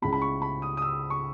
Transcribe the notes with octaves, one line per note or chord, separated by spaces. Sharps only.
C#2 C#3 G#3 C#4 E4 B5
B5
C#6
B5
D#6
D#6
E6
C#6